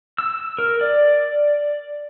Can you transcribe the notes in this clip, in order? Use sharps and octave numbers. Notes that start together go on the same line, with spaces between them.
E6
A#4
D5